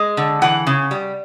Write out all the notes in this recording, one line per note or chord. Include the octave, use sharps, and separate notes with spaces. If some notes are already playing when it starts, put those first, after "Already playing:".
Already playing: G#3
D3
E3 F#5
C#3
G3